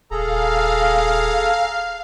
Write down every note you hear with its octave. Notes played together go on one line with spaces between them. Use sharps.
D#1 G#4 A4 F5 A#5